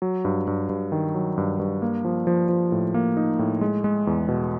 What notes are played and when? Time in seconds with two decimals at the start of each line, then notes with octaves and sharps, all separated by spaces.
0.02 F#3
0.25 G2
0.47 G2
0.69 G2
0.92 D#3
1.14 F#3
1.38 G2
1.59 G2
1.82 A#3
2.04 F3
2.27 F3
2.49 F3
2.72 A2
2.94 A#3
3.17 D#4
3.39 A2
3.61 G#3
3.84 G#3
4.07 E2
4.28 B2